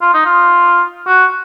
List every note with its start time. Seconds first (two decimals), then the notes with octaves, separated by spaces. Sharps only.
0.01 F4
0.14 D#4
0.25 F4
1.07 F#4